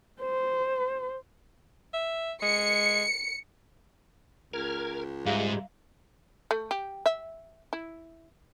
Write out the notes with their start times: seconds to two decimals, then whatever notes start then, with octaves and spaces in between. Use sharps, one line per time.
0.22 C5
1.94 E5
2.42 G#3 C#7
4.53 C#2 A#4 F6 G#6
5.26 G#2 G3 G#3 E5 F5
6.51 A3
6.71 G4
7.06 E5
7.73 E4